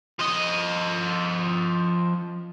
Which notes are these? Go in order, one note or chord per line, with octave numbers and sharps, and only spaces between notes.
F3 D#5